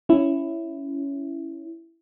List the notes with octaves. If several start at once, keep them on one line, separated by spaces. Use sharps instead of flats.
C#4 E4